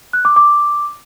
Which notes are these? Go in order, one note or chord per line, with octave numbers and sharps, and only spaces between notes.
F#6
D6
D6